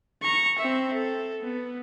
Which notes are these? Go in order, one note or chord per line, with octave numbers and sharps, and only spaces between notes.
A#5 C#6
C4 E5
A4
B3